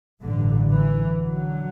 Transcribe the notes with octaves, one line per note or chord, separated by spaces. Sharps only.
A1 G2 D3
E3
D3 F#3